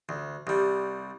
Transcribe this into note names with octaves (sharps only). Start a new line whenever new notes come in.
D2
C2 G3